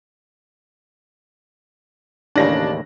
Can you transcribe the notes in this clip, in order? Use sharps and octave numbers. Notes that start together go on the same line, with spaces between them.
A1 D#2 C#3 D4 A#6